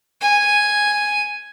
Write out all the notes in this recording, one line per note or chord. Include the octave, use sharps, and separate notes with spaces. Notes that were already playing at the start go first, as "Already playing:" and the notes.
G#5